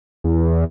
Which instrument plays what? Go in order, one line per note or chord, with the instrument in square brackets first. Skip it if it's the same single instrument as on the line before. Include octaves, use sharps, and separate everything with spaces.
[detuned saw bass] E2